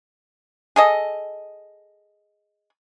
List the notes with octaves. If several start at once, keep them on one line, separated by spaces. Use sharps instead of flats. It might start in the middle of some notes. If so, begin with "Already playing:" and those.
G#4 A4 D#5